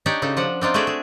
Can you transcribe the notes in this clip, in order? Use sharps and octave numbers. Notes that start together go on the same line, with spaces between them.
D4 D#4 G4 C#5 D5
C#3 D#4 A4
F3 D4 F#5
C4 D4 D#4 F4
A3 F#4 G#4 D5 E5
G#4